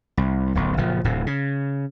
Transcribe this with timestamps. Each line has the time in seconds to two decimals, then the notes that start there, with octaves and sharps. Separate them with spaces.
0.17 C2
0.55 D1 B1
0.77 F#1 A#2 F3
1.04 D1 A2 C3
1.27 C#3